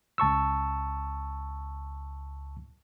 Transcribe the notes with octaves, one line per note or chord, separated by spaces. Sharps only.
C#2 A5 C#6 E6